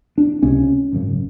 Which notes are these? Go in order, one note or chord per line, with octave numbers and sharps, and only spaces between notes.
D4
C#2 C3 C#4
G#1 F#2 C#3